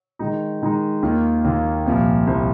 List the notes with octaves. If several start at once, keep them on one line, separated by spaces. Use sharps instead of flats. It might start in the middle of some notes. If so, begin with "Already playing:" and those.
D#3 G#3 D#4
D#3 G#3 D#4
D#2 D#3 A#3 F4
D#2 D#3 A#3 F4
C2 A#2 F3
C2 A#2 F3